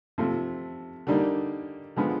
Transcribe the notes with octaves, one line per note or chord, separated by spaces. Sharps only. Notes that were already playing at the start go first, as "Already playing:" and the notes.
C3 F3 A3
D3 G3 A#3 D#4
D3 F3 G#3 B3